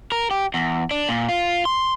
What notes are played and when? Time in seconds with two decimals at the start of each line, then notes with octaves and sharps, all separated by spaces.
0.12 A#4
0.31 G4
0.54 E2
0.91 D4
1.09 A#2
1.29 F4
1.65 C6